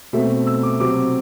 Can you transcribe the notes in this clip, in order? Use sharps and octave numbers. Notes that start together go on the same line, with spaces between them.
B2 A3 C4 E5
E6
D6
C3 F#3 C4 D6